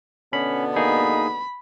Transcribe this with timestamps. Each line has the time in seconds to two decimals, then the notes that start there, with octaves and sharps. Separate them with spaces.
0.33 B2 D3 B3 C#4 B5
0.76 A#3 D#4 G#4 B5